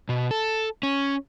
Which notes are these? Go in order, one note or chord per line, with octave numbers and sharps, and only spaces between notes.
B2
A4
C#4